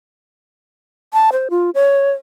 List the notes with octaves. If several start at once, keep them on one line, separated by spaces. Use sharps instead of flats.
A5
C5
F4
C#5